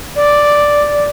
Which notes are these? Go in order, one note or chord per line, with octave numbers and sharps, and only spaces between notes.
D5